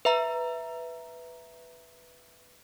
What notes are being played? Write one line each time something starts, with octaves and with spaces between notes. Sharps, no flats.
B4 E5 A#5